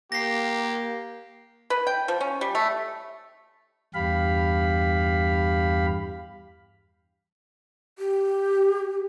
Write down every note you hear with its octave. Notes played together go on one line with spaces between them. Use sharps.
A#3 G4 A#6 C7
B4
G5
F3
C#4
G3
A3
E2 G2 G4 F5 B5
G4